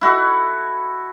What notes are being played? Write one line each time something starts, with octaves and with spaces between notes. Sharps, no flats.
E4 F#4 A4